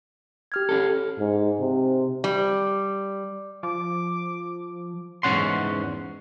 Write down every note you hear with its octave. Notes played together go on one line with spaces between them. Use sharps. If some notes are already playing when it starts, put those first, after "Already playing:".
G4 F6 G#6
C#4 A4
G#2
C3
G3
F3 D6
E2 G#2 F3 C#4 F#5 C6